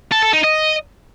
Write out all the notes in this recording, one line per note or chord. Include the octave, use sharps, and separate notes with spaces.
A4
A4
D#4
D#5